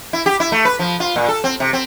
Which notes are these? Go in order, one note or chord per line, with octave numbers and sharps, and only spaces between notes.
E4
G4
E4
A3
B4
F3
F4
A#2
A4
C4
C3
C4